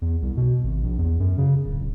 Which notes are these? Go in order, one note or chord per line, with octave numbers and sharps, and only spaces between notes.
E2
C2
B2
G#1
A#1
E2
F#2
C#3
D1
D1